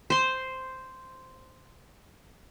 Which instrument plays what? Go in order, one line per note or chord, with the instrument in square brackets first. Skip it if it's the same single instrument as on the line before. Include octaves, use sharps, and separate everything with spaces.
[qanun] C5 C6